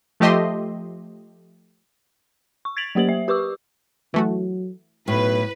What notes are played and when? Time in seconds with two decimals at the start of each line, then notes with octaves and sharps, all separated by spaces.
0.20 F3 A3 G4 D#5 E5 C6
2.65 C#6
2.77 G#6 A6 B6 D7 F7 F#7
2.95 F#3 A#3 G4 C5 F#7
3.09 E5
3.28 G4 B4 C#6 D6 E6
4.14 E3 F#3 A3 F#4
5.08 B1 A2 B4